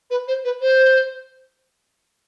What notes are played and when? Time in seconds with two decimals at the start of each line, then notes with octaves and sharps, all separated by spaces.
0.10 B4
0.28 C5
0.45 B4
0.61 C5